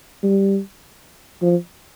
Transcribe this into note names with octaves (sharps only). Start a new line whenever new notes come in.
G3
F3